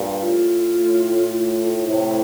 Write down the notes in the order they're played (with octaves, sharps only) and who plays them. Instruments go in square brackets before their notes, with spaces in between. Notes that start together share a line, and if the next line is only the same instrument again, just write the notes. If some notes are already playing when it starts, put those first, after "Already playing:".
Already playing: [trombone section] G2 A#2
[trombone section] A2 [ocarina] F4
[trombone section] A2
[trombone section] A2 C3 [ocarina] E4